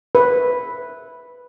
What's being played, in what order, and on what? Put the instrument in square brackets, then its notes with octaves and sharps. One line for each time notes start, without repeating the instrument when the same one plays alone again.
[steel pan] B4